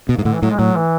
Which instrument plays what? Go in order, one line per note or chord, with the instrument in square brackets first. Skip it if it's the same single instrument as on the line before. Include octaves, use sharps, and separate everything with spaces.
[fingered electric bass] B2
G#2
[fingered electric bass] A2 [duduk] D3
[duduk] E3
[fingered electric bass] A2 [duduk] F#3
[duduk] G#3
[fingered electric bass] A2 [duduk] F#3
[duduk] E3